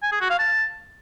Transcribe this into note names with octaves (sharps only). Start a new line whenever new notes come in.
G#5
G#4
F#4
F5
A5